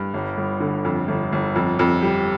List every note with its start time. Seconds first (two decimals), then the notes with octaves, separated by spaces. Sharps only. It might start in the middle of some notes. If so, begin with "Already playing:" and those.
Already playing: G2
0.14 G1
0.37 G1
0.60 D3
0.85 F2
1.08 G1
1.32 G1
1.56 F2
1.79 F2
2.03 G3